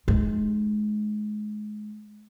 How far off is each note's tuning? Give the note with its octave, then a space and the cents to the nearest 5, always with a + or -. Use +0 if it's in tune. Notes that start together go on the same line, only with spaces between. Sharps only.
G#3 +30 D#4 -15